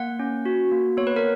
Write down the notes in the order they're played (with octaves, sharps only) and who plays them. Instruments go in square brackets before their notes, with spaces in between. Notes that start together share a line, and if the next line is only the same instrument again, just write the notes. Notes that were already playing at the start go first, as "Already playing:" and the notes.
Already playing: [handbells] A#3 F#5
C#4
F#4
A#3
B3 C#5
B4
A#4